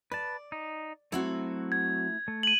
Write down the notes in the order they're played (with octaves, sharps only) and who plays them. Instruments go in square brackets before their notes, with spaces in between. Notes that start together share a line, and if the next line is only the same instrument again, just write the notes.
[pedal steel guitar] B4 A5 [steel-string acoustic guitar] D5
[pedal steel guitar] D#4
[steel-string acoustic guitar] F#3 C4 F#4 [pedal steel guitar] A3 E4
[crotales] G#6
[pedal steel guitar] A3
[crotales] D#7 F#7